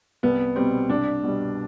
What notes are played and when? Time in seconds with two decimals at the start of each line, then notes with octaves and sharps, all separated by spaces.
0.23 C2 B3
0.56 B2 G3 C4
0.89 C2 D4
1.23 B2 G3